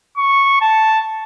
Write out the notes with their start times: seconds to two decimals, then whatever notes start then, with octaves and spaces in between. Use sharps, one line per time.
0.18 C#6
0.61 A5